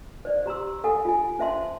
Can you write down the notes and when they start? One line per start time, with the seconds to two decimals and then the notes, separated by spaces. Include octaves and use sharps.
0.25 C5 D5
0.46 G4 A#5 C6 E6
0.84 A4 F#5 G#5
1.05 F4 G#5
1.39 C#4 C5 E5 A5 C6